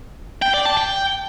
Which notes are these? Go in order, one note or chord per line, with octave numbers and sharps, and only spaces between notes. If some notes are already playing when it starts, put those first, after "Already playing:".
G5
D5
A5
G5